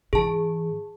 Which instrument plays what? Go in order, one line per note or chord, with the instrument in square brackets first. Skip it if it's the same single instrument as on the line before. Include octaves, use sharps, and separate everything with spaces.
[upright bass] G#2 E3 [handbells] G#4 A5